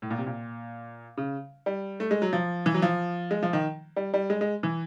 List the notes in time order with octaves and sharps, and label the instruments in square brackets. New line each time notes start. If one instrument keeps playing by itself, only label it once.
[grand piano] A2
A#2
C3
A#2
C#3
G3
A3
G#3
F#3
F3
E3
F#3
F3
G#3
F3
D#3
G3
G3
G#3
G#3
E3